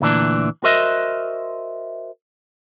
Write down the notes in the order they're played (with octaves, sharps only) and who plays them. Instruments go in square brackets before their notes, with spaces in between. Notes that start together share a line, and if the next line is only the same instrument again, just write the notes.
[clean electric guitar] D2 A#2 E3 D4
F#4 A#4 C5 D#5 E5